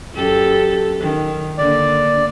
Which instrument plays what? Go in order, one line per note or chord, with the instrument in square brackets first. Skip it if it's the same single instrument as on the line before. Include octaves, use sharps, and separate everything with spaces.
[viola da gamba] F#2 G4 A4
D#3
[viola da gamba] D3 A#3 [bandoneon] D5